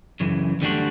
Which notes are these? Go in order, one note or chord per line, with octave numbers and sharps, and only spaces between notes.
F#2 C#3 E3
D2 D3 G3 D4 F#4